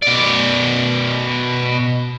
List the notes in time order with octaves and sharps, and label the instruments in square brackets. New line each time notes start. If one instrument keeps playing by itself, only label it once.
[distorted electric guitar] B2 D5